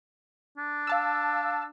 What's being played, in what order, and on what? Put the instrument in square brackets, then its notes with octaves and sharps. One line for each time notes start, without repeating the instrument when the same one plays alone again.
[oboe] D4
[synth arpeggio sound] F5 A5 E6